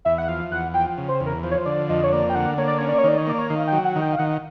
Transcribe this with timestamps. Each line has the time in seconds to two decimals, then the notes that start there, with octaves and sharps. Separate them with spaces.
0.05 E2 E5
0.18 F#5
0.28 F3 F5
0.51 E2 F#5
0.74 F3 G5
0.98 C#3
1.08 C5
1.20 E2
1.26 A#4
1.43 F3 C5
1.51 C#5
1.58 C5
1.65 D3 D5
1.89 F2 D#5
2.04 C#5
2.13 A#3 D5
2.30 G5
2.35 D3 F#5
2.58 A#3 C#5
2.68 D5
2.78 C#4 C#5
2.89 D5
2.98 C#5
3.04 D#3 D5
3.18 C#5
3.27 A#3 D5
3.38 C#5
3.49 D#3 F5
3.67 G5
3.72 F#3
3.85 F#5
3.96 D#3
4.01 G5
4.13 F5
4.19 D#3 F#5